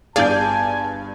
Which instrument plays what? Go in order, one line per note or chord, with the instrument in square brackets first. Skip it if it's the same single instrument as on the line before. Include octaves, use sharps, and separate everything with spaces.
[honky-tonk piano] G1 G2 G6 [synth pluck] G#4 D5 F5 [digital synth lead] G#5 [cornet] A5